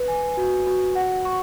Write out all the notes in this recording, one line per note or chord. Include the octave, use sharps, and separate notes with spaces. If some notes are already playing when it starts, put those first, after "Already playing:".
Already playing: B4
G#5
F#4
F#4
F#5
C#6